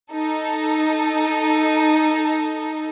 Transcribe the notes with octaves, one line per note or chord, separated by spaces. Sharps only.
D#4 A4